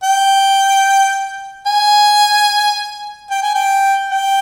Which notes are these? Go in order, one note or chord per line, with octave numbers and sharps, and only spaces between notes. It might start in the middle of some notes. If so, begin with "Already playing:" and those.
G5
G#5
G5
G#5
G5
G5